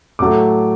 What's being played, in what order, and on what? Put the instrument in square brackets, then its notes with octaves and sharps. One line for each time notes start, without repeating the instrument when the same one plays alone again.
[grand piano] A2 F#3 A3 D6